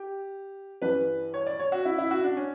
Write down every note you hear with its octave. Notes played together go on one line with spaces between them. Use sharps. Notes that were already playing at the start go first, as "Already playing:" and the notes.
Already playing: G4
G2 E3 B4
C#5
D5
C#5
F#4
E4
E4
F#4
D4
C#4